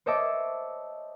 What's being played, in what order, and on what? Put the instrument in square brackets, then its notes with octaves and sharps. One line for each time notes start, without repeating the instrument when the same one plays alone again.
[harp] C5 C#5 D#5 E5 A5 D6